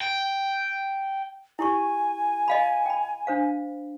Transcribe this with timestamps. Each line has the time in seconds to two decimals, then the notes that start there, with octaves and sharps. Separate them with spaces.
0.01 G5
1.59 E4 G4 G#5 C#6
2.48 D#5 F5 B5
2.86 G5 B5
3.27 D4 C5 F5